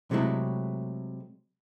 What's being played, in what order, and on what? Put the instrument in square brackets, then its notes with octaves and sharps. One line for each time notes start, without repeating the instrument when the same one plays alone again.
[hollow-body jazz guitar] C3 F#3 G#3 A3 E4